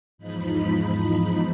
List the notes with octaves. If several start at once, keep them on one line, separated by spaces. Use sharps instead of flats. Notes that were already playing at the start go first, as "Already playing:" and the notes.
E2 G#2 F3 D#4 B5